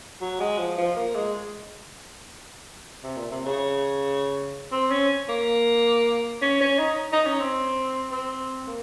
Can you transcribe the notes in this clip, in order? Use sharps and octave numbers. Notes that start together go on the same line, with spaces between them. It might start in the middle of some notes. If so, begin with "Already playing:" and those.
F#3
G#3
F3
F3
A#3
G#3
C3
A#2
C3
C#3
C4
C#4
A#3
C#4
C#4
D#4
D#4
C#4
C4
C4
A#3